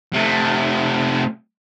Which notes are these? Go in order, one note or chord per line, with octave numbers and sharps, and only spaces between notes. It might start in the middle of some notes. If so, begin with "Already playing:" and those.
C3 A3